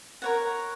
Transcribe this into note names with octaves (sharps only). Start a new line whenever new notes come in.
A#4 C#5 F#5